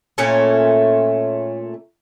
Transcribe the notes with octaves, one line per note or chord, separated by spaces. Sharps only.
A#2 A3 C#4 C#5